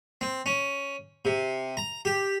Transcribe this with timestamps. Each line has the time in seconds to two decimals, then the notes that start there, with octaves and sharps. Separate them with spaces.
0.21 C4
0.46 C#4
1.25 C3
1.77 A#5
2.05 G4